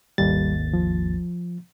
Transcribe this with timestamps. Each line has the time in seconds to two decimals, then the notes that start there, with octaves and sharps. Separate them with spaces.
0.18 G#1 D#2 G3 A6
0.73 F3